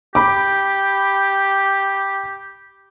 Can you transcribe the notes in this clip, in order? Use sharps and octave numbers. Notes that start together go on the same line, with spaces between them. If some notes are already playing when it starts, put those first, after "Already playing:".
G4 B5 D6